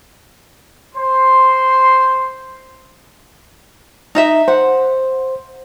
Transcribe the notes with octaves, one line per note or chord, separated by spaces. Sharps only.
C5 C6
D#4 D#5 E5
C5 F#5